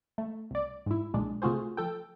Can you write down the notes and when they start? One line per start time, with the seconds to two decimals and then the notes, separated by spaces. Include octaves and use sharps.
0.18 A3
0.51 C2 D5
0.86 G#2 E4
1.13 B1 A#2 G#3 D4
1.42 C3 A3 F4 F#4 G#4 C5
1.77 F3 A4 G5